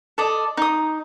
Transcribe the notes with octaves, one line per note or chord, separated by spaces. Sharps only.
A4 D5 D#5
D#4 D#6